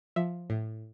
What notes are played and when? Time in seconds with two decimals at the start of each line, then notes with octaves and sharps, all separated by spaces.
0.16 F3 E5
0.50 A2